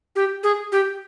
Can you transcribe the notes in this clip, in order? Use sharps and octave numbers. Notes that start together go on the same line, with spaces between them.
G4
G#4
G4